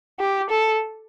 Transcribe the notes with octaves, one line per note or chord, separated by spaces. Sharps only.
G4
A4